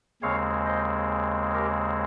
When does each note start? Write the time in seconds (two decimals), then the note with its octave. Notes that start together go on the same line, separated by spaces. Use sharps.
0.22 D#2 C#3 G#3 C4 C#5 F5
0.66 C5 D#5
1.54 G4 A#4